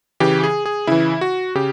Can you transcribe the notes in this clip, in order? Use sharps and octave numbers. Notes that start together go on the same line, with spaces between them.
C#3 E3 G4
G#4
G#4
C#3 E3 E4
F#4
C#3 G4